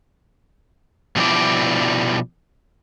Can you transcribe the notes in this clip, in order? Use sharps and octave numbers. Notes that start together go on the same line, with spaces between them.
B2 F3 G3 D4 E4 D5